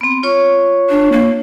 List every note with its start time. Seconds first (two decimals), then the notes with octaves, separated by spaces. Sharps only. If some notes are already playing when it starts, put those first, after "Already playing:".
0.01 B3 C4
0.23 F4 C#5 C#6
0.90 D4
1.12 A#3